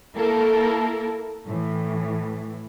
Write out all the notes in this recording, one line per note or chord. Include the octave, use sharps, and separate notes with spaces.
A#3 E4 A4 A#4
A2 E3